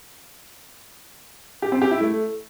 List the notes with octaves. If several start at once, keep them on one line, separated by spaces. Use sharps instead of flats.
G4
C4
G4
E4
A3